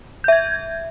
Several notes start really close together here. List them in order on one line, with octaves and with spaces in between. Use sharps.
G6 E5 G#6